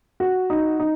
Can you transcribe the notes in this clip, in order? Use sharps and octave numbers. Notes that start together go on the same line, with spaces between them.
F#4
D#4
D#4